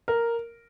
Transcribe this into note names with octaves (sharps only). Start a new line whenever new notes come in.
A#4